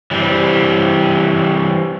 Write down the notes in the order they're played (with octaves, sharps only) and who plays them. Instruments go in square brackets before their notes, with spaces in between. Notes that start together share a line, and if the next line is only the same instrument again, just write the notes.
[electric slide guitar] E3 G3 C4